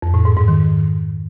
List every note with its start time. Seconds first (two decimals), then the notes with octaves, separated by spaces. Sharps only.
0.02 F2
0.14 A2
0.25 G#2
0.37 G#2
0.48 D#3